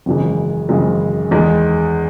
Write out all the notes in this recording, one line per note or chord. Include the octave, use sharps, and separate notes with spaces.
G#1 F#2 C#3 E3 G#3
G#1 F#2 C#3 E3 G#3
E2 D#3 G#3 B3